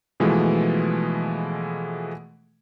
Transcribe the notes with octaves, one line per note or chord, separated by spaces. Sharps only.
B2 E3 F3 G#3 A3